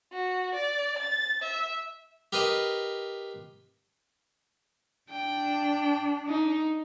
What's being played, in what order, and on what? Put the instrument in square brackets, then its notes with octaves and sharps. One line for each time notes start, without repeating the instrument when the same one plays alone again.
[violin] F#4
D5
A6
E5
[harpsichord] G4 A#4 B4 D#5 C6
[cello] D4 [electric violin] G5
[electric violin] D#4